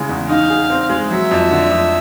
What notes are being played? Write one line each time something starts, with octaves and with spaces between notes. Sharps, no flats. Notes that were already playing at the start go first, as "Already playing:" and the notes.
Already playing: C#3 E3 G#3
E2
D#4 F5
G#4
C4
G#3
F#3 E5
F2
D3
F2